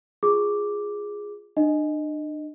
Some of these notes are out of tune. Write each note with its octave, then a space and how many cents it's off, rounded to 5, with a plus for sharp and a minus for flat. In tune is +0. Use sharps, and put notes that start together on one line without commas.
F4 +0 G#4 -5 D6 +0
D4 +40 D#5 +0